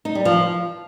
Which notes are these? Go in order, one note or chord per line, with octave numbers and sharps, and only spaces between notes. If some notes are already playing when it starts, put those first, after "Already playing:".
D#4
G3
F3